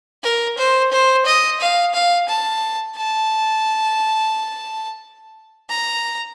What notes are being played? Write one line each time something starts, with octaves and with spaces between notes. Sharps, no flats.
A#4
C5
C5
D#5
F5
F5
A5
A5
A#5